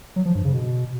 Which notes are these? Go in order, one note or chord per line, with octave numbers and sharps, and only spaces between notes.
F#3
F3
G2
C#3
B2